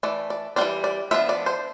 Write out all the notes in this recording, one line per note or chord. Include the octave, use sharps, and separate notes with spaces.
E3 A3 D5
D5
E3 G3 C4 D5
D5
F3 B3 D4 E5
D5
C5